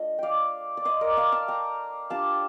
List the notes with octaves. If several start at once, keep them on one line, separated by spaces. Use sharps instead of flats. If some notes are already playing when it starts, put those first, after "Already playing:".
Already playing: A3 D4 F4 D#5
D5 F5 G5
D5
C5 D#5
A#4 D5
D5 F5
F5 A5
G5 A#5
G3 D4 F4 F5 A5